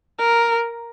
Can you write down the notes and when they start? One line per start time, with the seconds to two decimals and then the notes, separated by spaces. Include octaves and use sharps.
0.19 A#4